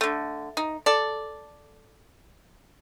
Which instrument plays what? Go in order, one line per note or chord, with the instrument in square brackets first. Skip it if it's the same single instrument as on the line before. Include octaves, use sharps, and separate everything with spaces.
[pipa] D3 A3
D#4
A4 D5